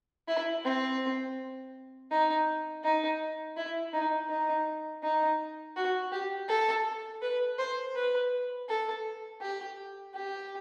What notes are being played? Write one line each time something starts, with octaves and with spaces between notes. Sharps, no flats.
E4
C4
D#4
D#4
E4
D#4
D#4
D#4
F#4
G4
A4
B4
C5
B4
A4
G4
G4